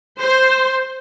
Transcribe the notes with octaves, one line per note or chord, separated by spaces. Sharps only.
C5